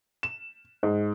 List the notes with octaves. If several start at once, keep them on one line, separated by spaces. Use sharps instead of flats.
E7
G#2